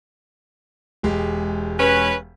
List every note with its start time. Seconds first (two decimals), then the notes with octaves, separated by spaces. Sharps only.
1.03 E1 G#3 G4
1.79 C#4 B4